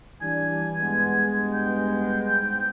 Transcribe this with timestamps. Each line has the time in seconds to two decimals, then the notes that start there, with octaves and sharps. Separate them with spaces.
0.21 E3 G3 D4 G#5
0.80 G2 G#3 B3
1.53 G5
2.36 G#2